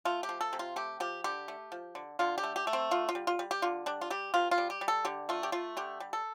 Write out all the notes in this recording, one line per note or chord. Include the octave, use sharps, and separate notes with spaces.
A3 F4
G4
F3
A4
C3
F4
A3 G4
F3 G4
D3 G4
A3
F3
D3
D3 F4
G4
A3
G4
A3
C4
D3 F4
F4
G3
F4
G3
G4
D3 F4
G3 D4
F4
G3 G4
C3 F4
F4
G3
G4
G3
A4
D3 G4
A3 F4
G4
A3 F4
D3 G4
G3
A4